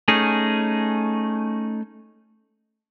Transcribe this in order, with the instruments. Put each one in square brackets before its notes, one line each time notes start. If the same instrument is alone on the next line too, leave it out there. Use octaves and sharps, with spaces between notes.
[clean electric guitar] A3 C#4 D#4 G#4